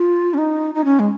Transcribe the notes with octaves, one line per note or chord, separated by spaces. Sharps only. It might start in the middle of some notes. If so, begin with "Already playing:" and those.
Already playing: F4
C#4
D#4
D#4
C#4
G#3